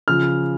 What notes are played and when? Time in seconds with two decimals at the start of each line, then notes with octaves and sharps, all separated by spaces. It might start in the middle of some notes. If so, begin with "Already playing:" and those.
0.08 C#3 F3 F6